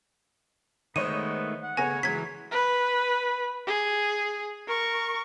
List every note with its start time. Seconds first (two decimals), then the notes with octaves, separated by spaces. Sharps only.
0.96 D#3 G#3 A3 B3 C5 C#5 D#5 D#7
1.63 F#5
1.77 C#3 A3 B3 C#5 G#5 A#6
2.03 C#3 E3 F#3 G#3 G#6 B6
2.51 B4
3.67 G#4
4.67 A#4 C#6